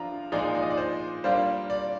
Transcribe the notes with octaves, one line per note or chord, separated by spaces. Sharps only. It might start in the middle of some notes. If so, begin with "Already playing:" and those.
Already playing: F3 D4 F4 A#5
A#2 F3 G#3 D#4 D5
D5
D#5
D5
C5
G3 A#3 D4 F4 C5
D5